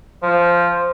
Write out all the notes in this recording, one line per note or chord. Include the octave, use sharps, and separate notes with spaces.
F3 C5